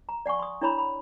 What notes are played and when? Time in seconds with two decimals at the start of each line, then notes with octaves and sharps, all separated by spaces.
0.09 A#5
0.26 D5 F#5 G#5 C#6
0.39 C6 D#6
0.62 D4 E4 C#5 A#5 B5
0.78 B5